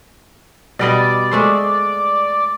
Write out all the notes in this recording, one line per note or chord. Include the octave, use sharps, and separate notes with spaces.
B2 G3 D5 D#5
G#3 A3 C5